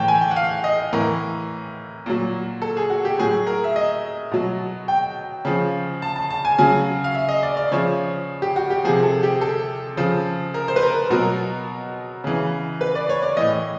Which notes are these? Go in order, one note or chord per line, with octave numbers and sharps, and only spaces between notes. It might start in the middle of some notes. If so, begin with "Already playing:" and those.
Already playing: A2 E3 G5 A5
G#5
G5
F#5
F5
D#5
A2 E3 A#4
A#2 F#3
A4
G#4
F#4
G4
A2 F#3 G#4
A#4
E5
D#5
B2 F#3
G5
C#3 F3
A5
A5
A5
G#5
C#3 F#3 G#5
F5
E5
D#5
D5
D5
C#3 F3 C#5
G4
F#4
G4
C3 F3 G#4
A4
G4
A4
C#3 F3
A#4
C5
B4
A#4
B2 F#3 A#4
C#3 E3
B4
D5
C#5
D5
A2 E3 D#5